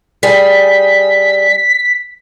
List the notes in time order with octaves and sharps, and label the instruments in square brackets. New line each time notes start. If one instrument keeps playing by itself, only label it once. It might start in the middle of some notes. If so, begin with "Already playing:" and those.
[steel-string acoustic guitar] G3 G#4 [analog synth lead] B6